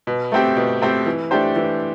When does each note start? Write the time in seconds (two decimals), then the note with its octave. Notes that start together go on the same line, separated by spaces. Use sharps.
0.07 B2
0.32 A3 C4 G4
0.57 B2
0.82 A3 C4 G4
1.06 E3
1.31 A3 D4 G4 C5
1.56 E3